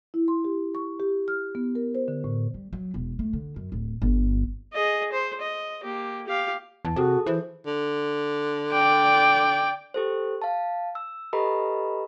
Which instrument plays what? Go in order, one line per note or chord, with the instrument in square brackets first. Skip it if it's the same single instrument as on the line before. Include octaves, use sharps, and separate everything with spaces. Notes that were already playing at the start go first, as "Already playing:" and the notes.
[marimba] E4
C6
G4
C#6
G4
F6
B3
A#4
C5
D3
A2
[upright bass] G3
F#3
E1
A3
D3
F#2
D1
G1
[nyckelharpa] G#4 D#5
C5
D#5
A#3 G4
G4 F5
[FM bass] E2 [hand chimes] A5
[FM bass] C3 [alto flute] F#4 [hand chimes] G#4 A4 D#6
[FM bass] E3 [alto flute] C5
[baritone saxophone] D3
[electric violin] D5 G5
[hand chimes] G4 A4 C5
F5 A5
E6
G4 A4 B4 D#5 A#5 B5